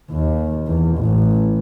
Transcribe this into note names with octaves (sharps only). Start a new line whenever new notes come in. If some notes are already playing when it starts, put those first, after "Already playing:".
D#2
E2
A1